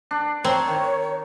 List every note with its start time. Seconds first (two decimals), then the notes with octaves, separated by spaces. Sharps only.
0.11 D4
0.44 C4 C#5 A#5
0.67 D#3